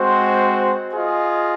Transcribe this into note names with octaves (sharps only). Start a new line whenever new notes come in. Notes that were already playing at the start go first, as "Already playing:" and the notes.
Already playing: G#3 C4 F#4 C5
F4 G#4 D#5